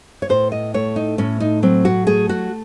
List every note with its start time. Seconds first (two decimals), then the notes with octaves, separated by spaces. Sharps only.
0.22 C#5
0.29 A2 C5
0.52 D#5
0.74 A3 C#5
0.96 D#4
1.18 A2 C#4
1.40 D#4
1.63 F#3 C4
1.85 F#4
2.07 A3 G#4
2.29 F#4